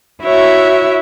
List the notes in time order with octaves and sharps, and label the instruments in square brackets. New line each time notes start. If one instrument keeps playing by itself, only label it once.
[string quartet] E4 F#4 C#5 E5